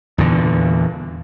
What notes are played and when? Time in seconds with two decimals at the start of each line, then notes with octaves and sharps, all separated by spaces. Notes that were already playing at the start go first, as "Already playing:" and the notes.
0.18 E2 A#2 D3